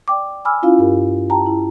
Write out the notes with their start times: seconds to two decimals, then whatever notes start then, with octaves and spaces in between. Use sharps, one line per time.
0.08 D5 G5 D6
0.45 G#5 B5 D6 E6 F6
0.62 C#4 E4 F4 F5
0.78 G2 G4 A#4
1.30 G4 G5 A5 A#5
1.46 E4